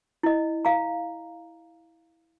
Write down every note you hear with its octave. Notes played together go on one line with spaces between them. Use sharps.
E4 D#5
F5 A#5